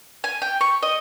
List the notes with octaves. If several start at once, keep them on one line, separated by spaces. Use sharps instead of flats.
G#5
G5
C#6
D#5